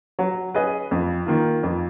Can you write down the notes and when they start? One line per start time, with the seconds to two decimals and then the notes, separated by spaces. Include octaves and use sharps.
0.19 F#3
0.54 C#4 G#4 B4 D#5
0.91 F2
1.26 D#3 A#3 F4
1.63 F2